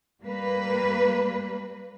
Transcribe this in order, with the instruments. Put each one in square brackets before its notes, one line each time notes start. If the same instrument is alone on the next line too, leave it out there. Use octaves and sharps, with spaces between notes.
[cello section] G3 A#3 B4